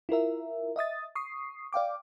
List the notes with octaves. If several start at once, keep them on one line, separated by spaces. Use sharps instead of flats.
E4 F4 A#4 E5
D#5 E5 D#6 A6
C#6 D#6 C7
D5 F5 G5 D6